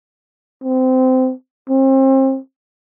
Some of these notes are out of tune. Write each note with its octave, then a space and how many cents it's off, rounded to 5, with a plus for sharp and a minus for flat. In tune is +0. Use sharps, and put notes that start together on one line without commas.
C4 -20
C4 +35